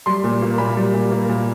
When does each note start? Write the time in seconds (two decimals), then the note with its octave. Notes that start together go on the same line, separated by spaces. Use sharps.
0.06 G3 C6
0.24 A#2
0.42 A#3
0.58 A#2 B5
0.77 G3
0.93 A#2
1.12 A#3
1.29 A#2